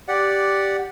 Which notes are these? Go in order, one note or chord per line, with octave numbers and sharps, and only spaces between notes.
G4 D5 F#5